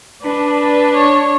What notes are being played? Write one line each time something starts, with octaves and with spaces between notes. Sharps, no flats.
D4 B4
B4
C#5